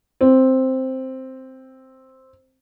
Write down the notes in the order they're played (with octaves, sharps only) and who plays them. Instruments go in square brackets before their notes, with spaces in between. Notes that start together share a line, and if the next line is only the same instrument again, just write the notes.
[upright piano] C4